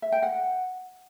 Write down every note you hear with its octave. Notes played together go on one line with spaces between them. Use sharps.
E5
G5
F#5